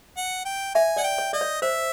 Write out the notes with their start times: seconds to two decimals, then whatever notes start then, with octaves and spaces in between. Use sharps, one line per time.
0.17 F#5
0.45 G5
0.75 E5 G#5
0.97 D5 F#5
1.04 G5
1.18 C#5
1.33 D5 D#5
1.41 C#5
1.62 C5 E5